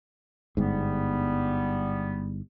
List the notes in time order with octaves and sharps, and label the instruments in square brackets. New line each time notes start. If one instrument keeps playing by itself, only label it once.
[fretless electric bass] G1 G#2 [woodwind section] G3 B3